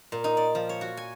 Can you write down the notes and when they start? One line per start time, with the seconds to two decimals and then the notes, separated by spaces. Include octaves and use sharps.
0.12 A#2
0.24 D#4
0.37 D5
0.55 F3
0.69 C#5
0.81 F#4
0.97 G#5